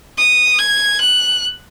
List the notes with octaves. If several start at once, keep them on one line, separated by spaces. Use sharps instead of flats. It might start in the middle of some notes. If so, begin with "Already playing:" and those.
D#6
G#6
F#6